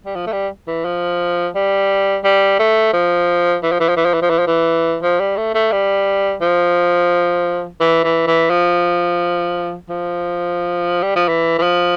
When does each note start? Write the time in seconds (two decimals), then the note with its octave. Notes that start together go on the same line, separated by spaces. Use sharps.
0.06 G3
0.16 F3
0.27 A3
0.33 G3
0.67 E3
0.85 F3
1.55 G3
2.24 G3
2.59 A3
2.93 F3
3.63 E3
3.72 F3
3.80 E3
3.89 F3
3.97 E3
4.05 F3
4.14 E3
4.22 F3
4.30 E3
4.39 F3
4.47 E3
5.03 F3
5.20 G3
5.37 A3
5.55 A3
5.72 G3
6.42 F3
7.81 E3
8.04 E3
8.27 E3
8.50 F3
9.89 F3
11.03 G3
11.16 F3
11.28 E3
11.58 E3
11.63 F3